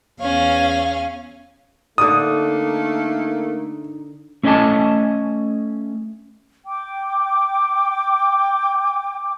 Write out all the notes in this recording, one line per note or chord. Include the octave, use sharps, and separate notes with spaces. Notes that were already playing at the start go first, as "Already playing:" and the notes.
E2 C#4 F5
D3 A3 A#3 D#4 D5 D#6
A3 C#4 D4 D#5 G#5 A5
G5 D6